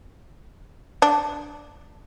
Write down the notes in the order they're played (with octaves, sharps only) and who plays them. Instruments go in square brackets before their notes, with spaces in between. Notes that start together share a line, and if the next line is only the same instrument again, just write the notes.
[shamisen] D4